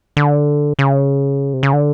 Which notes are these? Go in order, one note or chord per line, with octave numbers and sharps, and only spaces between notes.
D3
C#3
C3
C#3
D3